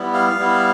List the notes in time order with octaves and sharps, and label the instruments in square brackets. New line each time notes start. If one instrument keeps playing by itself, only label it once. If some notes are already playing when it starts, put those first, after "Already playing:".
Already playing: [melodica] G3 B3 E4
F5
G3 B3 E4